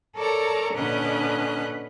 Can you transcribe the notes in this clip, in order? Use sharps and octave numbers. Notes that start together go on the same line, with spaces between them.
A4 A#4 C#5 D5 A5 A#5
A#2 D3 C#4 B4 D#5 F#6